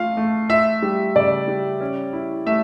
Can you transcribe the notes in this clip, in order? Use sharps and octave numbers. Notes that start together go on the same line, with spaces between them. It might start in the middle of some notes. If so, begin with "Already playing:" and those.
Already playing: A3 F4 F5
A3
F4 E5
G3
C#3 D5
G3
C#4
E4
A3 E5